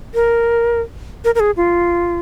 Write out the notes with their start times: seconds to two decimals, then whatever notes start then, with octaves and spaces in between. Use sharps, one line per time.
0.14 A#4
1.24 A#4
1.35 A#4
1.40 G#4
1.57 F4